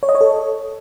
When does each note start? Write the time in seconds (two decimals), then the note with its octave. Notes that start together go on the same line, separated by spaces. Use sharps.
0.03 C#5
0.09 D#5
0.15 C#5
0.21 A4